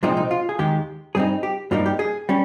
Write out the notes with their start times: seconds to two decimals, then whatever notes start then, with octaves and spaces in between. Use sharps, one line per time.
0.03 C2 A#2 F3 G#3 C4 D#4
0.17 D#4
0.31 F4
0.49 G#4
0.59 D#2 D#3 G#3 G4
1.15 G2 G3 C4 D#4 G#4
1.43 G4
1.71 G2 G3 A#3 D#4 F4
1.86 G4
1.99 G#4
2.29 G3 C#4